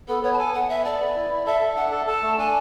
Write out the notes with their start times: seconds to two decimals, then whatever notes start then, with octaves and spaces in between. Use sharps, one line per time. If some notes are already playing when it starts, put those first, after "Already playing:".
0.08 B3 A4
0.23 B3 C#5
0.33 A5
0.39 A4 G#5
0.54 B3 F#5
0.69 B3 E5
0.85 A4 D5
1.00 B3
1.16 E4
1.30 E4
1.46 A4 E5
1.61 A4
1.76 D4 F#5
1.92 A4
2.07 A4 A5
2.22 A3
2.38 D4 G#5